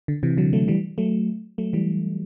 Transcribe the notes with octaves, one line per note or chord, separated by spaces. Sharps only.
D3
C3 E3
D3 F#3
F#3 A3
E3 G3
F#3 A3
F#3 A3
E3 G3